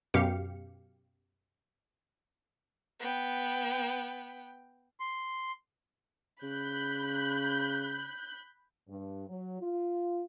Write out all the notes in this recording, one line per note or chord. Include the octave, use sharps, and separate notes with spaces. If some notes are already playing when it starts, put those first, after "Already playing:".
F#2 B2 G4 F5 C#7
B3 G5
C6
C#3 B5 F#6 G6
G2
F#3
F4